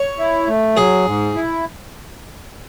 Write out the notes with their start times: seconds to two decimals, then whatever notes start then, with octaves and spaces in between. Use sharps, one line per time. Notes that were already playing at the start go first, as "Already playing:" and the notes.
Already playing: C#5
0.18 E4
0.47 A3
0.76 F#3 G#4
1.05 G#2
1.35 E4